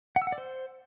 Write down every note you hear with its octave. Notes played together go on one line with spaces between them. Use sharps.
F#5
E6
F#5
D5
C5